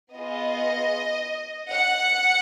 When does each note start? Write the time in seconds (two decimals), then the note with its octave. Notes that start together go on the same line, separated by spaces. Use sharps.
0.16 B3 F4 G#4 D#5
1.72 F#5